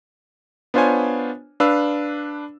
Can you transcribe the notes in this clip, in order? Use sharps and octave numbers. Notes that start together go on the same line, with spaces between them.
B3 D4 F4 C5 C#5 G#5
D4 B4 F5 E6